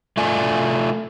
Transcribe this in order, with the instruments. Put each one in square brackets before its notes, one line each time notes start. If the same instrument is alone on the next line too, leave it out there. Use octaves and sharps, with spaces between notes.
[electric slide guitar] A3 F4 D5 G#5